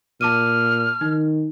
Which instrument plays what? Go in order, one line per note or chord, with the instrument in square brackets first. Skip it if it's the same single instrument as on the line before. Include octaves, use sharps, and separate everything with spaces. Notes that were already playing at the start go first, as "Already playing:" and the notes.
[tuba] A#2 [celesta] A5 D6 D#7 [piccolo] F6
[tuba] D#3 [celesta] D#4